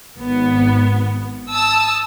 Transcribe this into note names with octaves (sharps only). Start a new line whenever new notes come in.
G#1 B3
A5 D#6 E6